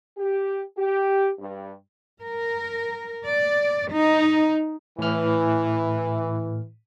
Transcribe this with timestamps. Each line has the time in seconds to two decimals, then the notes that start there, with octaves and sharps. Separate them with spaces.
0.18 G4
0.77 G4
1.39 G2
2.22 A#4
3.27 D5
3.92 D#4
4.99 A2 E3 F6